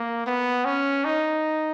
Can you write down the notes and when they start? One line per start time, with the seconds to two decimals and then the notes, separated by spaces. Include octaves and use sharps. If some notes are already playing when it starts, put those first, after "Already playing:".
Already playing: A#3
0.27 B3
0.65 C#4
1.05 D#4